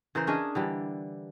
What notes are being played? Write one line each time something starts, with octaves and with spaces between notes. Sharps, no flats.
C#3 E3 A#4 C5
C#4 D4 G#4 D#5
D3 E3 G3